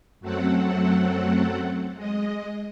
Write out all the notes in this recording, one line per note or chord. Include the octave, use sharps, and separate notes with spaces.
F#2 F#3 A3 C4 A4 F#5
G#3 D#5